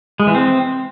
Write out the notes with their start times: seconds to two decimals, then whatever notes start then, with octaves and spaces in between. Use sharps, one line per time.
0.20 G#3
0.27 E3
0.35 C4